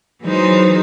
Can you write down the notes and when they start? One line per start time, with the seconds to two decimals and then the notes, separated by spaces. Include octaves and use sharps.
0.22 E3 F#3 G#3 D#4 C5